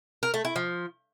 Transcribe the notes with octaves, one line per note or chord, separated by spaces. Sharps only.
A#4
A3
E4
F3